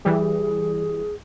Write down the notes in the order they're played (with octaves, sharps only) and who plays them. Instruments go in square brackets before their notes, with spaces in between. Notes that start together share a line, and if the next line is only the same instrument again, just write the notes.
[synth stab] E3 G3 [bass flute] G#4